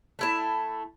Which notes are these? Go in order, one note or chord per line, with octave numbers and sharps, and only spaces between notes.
A3 E4 A5